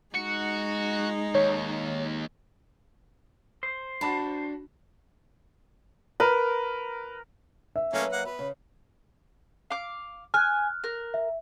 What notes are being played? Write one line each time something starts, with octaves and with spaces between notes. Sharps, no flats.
G#3 D#4 F#4 C#7
D#2 C#5
C5
D4 F#4 A5 B5
A#4 B4
E5
F#3 A3 A#3 C#4 B4
A#3 F#5
B3 B4
C#3
F5 D6
G#5 F6 F#6
A#4
E5